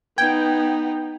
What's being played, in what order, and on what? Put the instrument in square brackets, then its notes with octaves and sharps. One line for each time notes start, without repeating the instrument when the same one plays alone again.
[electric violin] B3 D#4 [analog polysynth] G5 [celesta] G#6